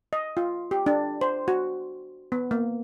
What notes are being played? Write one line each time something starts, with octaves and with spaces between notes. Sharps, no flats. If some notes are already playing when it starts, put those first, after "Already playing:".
D#5
F4
G4
D4
C5
F#4
B3
A#3